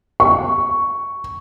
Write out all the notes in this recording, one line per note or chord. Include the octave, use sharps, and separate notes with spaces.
C#6